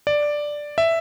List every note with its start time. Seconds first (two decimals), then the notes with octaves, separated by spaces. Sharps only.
0.07 D5
0.78 E5